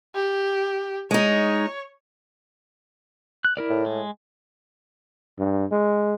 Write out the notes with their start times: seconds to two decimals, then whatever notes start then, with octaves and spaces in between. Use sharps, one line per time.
0.15 G4
1.11 G#3 D#4 C#5
3.45 F#6
3.57 E4 A#4 D5
3.70 A2
3.86 G#3
5.39 G2
5.71 G#3